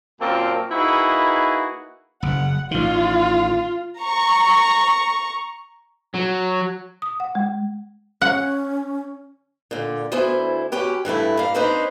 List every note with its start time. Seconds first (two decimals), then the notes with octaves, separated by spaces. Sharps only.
0.21 F#2 A#2 A#3 C4 A#4 A5
0.70 A#3 D#4 E4 F#4 G#4 B4
2.23 F#1 F#5
2.71 A1 D#3 F4
4.00 A#5 C#6
6.14 F#3
7.02 D#6
7.20 F#5
7.35 G#3
8.22 C#4 F#5
9.71 A#2 D3
10.12 D2 B3 E4 C5 G#5
10.72 F#2 C#4 G4 B4
11.05 G2 E3 A3 E4
11.39 A#3 F5
11.54 A#3 C4 D4 D#4 B4 C5